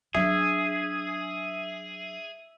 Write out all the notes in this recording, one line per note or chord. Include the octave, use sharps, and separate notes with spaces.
F#3 D4 G#4 E5